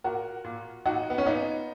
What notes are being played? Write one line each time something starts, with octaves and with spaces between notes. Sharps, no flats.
A#2 F#4 A#4
A#2
A#2 D#4 F#4
B3
C#4
A#2 B3 D#4